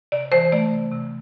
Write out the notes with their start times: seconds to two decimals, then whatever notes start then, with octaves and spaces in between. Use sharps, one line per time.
0.12 C3 D5
0.32 E3 C5
0.52 A3 D5
0.72 C3
0.91 C3